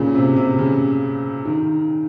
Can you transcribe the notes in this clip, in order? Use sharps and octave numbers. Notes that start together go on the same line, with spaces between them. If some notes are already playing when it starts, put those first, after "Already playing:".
Already playing: A#2 C#3
C3
C3
C#3
D#3